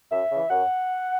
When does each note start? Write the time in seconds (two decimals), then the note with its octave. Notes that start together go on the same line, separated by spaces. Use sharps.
0.11 F#2 E5
0.31 C#3 E3
0.50 F#2 F#5